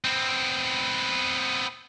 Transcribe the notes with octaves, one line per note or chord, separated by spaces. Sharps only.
B3 C4